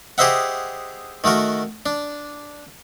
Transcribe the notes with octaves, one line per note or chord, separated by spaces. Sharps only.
G4 G#4 C5 D#5 E5 F#5
D#3 A3 F#4 A#4
D4